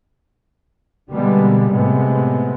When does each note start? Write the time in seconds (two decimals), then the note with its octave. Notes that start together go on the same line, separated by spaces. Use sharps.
1.12 B2 D3 G3 G#3 A#3 B3
1.70 A2 C3 G#3 B3